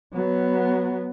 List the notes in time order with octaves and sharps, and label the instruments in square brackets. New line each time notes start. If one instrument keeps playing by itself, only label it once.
[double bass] F#3 B3